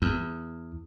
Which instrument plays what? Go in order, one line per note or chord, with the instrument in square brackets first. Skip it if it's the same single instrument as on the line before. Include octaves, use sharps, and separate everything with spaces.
[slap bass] E2